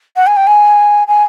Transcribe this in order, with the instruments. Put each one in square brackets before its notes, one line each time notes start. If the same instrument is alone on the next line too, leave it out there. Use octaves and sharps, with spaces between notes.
[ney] F#5
G#5
G5
G#5
G#5